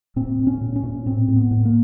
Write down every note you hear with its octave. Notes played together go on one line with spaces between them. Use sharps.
A#2 C4
A#2
C#4
A#2
C#4
A#2
A2 C4
A2
B3
A2
A#3